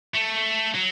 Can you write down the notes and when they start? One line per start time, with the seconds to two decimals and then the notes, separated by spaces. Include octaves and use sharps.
0.14 A3
0.75 F#3